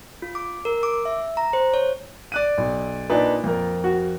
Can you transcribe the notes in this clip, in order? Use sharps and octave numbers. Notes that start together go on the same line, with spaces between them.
F4
D6
A#4
D6
E5
A#5
C5
C#5
D5 F#6 D#7
B1
A#2 D4 D#4 B4 D5
F2 A#4
F#4